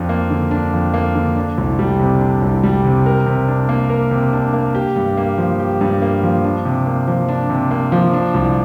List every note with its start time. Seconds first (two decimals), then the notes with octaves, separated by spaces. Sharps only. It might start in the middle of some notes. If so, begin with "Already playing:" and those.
Already playing: F2 D4
0.09 A#3
0.30 D3
0.51 D4
0.73 F2
0.94 A#3
1.15 D3
1.36 D4
1.58 C2
1.79 G3
1.99 C3
2.21 D4
2.42 C2
2.63 G3
2.85 C3
3.06 A#4
3.26 C3
3.48 D4
3.69 A#3
3.90 A#4
4.11 C3
4.33 D4
4.53 A#3
4.75 G4
4.96 G2
5.17 A#3
5.38 F3
5.59 G4
5.81 G2
6.02 A#3
6.23 F3
6.44 D4
6.65 C3
6.86 A#3
7.07 F3
7.28 D4
7.50 C3
7.71 A#3
7.92 F3
8.13 D4
8.34 C2